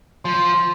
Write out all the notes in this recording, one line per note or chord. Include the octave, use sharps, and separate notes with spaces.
F3 C6